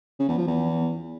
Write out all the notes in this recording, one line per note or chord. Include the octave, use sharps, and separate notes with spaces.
C#3
E2
F3
E2